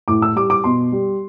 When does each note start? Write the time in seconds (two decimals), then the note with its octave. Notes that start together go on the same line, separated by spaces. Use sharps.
0.08 A2 D6
0.22 E6
0.36 G3 D6
0.50 D6
0.64 B2 C6
0.92 G3